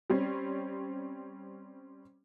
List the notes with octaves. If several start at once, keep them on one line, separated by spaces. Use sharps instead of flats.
G3 C4 C#4